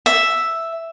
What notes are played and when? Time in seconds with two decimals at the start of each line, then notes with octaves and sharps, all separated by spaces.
0.06 E5